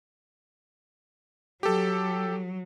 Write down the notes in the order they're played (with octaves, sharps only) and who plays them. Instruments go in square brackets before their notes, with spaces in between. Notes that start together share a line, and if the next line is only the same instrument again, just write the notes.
[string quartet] F#3 [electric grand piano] G4 A4